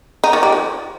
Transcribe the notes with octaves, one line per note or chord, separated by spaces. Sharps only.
D#4
D#3
G3
F3